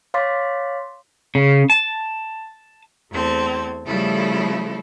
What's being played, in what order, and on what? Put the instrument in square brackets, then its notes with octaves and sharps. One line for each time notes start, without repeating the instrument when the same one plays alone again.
[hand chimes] C#5 F5 C6 D6 A6 B6
[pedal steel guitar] C#3
A5
[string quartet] E2 A3 C4 A4 G#6
C#3 F3 G3 A3 E4 A4